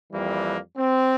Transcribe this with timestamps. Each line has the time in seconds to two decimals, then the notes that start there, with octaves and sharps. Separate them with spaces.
0.12 F2 E3 G3 A#3
0.77 C4